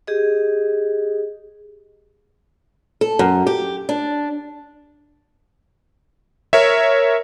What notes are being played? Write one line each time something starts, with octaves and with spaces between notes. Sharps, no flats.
G4 G#4 D#5
A4
F#2
G4
D4
A#4 C#5 E5